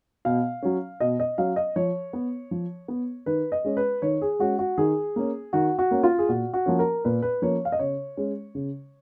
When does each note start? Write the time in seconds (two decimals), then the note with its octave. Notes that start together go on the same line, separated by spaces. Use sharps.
0.25 B2 F5
0.62 F#3 C#4
1.00 B2 D#5
1.20 D#5
1.38 F#3 C#4 F5
1.56 D#5
1.76 F3 C#5
2.13 B3
2.51 F3
2.88 B3
3.26 D#3 B4
3.52 D#5
3.64 G#3 C#4
3.77 B4
4.02 D#3 C#5
4.22 G#4
4.39 G#3 C#4 F#4
4.59 F#4
4.78 D#3 G#4
5.16 A#3 C#4
5.53 D#3 F#4
5.79 F#4
5.91 A#3 C#4
6.03 F4
6.18 G#4
6.29 A#2 F#4
6.54 F#4
6.66 F3 A#3 C#4
6.79 A#4
7.05 A#2 B4
7.22 B4
7.42 F3 A#3 C#4 C#5
7.65 F5
7.72 D#5
7.79 C#3 C#5
8.17 G#3 C#4
8.55 C#3